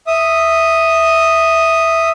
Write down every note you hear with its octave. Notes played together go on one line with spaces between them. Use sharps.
E5 D#6